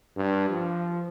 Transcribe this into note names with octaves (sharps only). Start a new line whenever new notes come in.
G2
F3